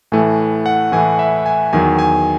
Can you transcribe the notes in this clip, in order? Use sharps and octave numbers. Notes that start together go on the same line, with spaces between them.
A2 E3 A3 G#5
F#5
A2 E3 A3 G#5
E5
G#5
E2 D#3 F#3 G#5
G#5